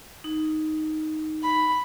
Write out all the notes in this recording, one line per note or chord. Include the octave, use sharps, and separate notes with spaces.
D#4
B5